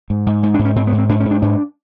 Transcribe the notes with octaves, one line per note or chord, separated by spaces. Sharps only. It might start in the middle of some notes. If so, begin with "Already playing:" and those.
G#2
G#2
G#2
D4
G#2
C#4
G#2 C4
B3
G#2
C4
G#2 D4
C#4
G#2
D4
G#2 D4